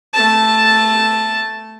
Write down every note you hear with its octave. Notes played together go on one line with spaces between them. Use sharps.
A3 A5